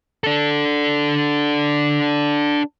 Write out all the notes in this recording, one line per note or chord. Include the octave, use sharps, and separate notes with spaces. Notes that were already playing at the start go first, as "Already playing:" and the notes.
D4 A4